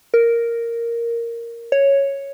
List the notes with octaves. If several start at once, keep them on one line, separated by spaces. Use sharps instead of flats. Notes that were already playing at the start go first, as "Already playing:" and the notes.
A#4
C#5